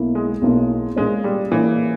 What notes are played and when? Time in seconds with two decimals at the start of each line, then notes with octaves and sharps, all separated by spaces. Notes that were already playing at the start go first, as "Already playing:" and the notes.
Already playing: B1 B2 A#3 E4
0.15 G#3
0.42 B1 B2 A#3 E4
0.96 A#2 G#3 A#3 C#4
1.24 G3
1.52 A#2 E3 A#3 C#4